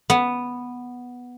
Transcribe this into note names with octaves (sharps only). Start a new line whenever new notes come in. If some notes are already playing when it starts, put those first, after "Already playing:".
B3